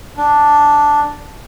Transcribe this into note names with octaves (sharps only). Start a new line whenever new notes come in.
D4